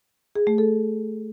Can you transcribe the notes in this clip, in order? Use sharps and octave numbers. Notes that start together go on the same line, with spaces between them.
G#4
A3
A4